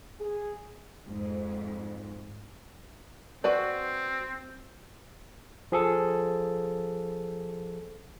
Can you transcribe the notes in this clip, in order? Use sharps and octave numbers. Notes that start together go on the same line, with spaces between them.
G#4
F2 G#2
C4 F#4 B4 D5
F3 G#4 A4